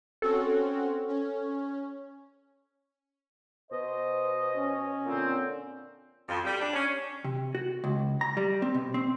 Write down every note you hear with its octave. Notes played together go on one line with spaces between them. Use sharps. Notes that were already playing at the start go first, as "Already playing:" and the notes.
C4 C#4 F#4 A4
C#4
B2 C5 D#5
C#4
A#2 D3 C4
F2
G3
D4
C#4
C3
F#4
C#2
A#5
G3
C4
B2
C4